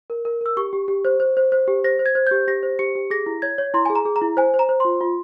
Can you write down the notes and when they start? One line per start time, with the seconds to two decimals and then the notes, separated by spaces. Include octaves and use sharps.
0.10 A#4
0.25 A#4
0.41 A#4 E6
0.57 G4 C#6
0.73 G4
0.88 G4
1.05 C5
1.20 C5
1.37 C5
1.52 C5
1.68 G4
1.84 C5 A#6
1.99 C5
2.06 G#6
2.15 C5
2.27 G4 G6
2.48 G4 A#6
2.63 C5
2.79 G4 C#7
2.95 G4
3.10 G#4 A#6
3.26 E4
3.42 C#5 G#6
3.58 C#5
3.74 E4 C6
3.85 G#4 G#5
3.95 A#5
4.05 G#4
4.16 A#5
4.21 E4
4.37 C5 G#5
4.54 C5
4.59 A#5
4.69 C5
4.80 F4 C6
5.01 F4